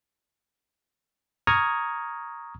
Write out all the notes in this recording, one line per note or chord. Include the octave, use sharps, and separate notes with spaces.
A#5 C#6 D#6 F6 G#6